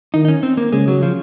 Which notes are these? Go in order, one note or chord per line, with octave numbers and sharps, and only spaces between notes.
D#3 D#4
D#4
C#4
C4
A#3
C#3 G#3
F#3
F3